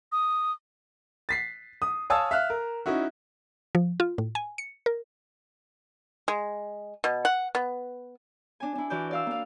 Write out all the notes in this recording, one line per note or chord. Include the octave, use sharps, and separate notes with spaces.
D#6
A6 B6 C7
D#6
C#5 F5 G#5 A5 D#6 E6
E5 F5 F6 F#6
A#4
C#4 D#4 E4 F#4
F3
F4
A2
G#5
C#7
A#4
G#3
B2
F#5
B3
D4 G#5
D4 E4
E3 E4 F#4 D5 G6
D5 F5 E6
A#3 F5